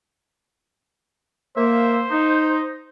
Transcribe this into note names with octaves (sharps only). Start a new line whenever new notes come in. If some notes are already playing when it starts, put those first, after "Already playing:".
A#3 C5 E5
D#4